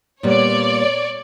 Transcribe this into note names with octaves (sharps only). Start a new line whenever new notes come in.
A#2 G3 B3 C#5 D5